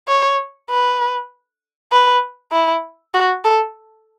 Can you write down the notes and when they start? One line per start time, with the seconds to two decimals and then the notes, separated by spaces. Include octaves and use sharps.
0.08 C#5
0.70 B4
1.92 B4
2.52 E4
3.14 F#4
3.45 A4